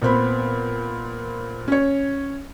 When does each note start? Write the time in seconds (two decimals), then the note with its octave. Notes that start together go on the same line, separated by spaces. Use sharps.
0.02 A#2 B3 C4 B5
1.68 C#4 C#5